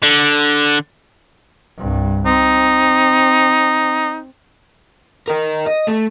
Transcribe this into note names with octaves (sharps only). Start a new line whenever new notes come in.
D3
C2 G2
C4 D#4
A#4 D#5
D#5
A3